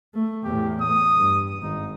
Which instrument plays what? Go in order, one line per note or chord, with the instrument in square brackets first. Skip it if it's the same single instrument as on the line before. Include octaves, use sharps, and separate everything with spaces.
[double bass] A3
[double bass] E2 A2 [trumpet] G4
[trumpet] D#6
[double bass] G2
[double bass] G#1 [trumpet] D#4